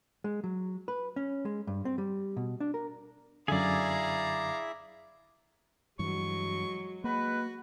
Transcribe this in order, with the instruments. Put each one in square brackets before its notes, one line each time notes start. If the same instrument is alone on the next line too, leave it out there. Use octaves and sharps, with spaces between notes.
[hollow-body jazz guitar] G#3
F#3
B4
C#4
G#3
G2
C4
G3
B2
D4
A#4
[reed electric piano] F#2 D3 [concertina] E4 E5 [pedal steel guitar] G#4 D5 [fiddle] F5 A#5
[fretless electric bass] G2 E3 [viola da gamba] F#3 G#3 [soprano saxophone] C#6
[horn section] G#3 B4 [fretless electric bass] A#3 [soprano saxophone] F#4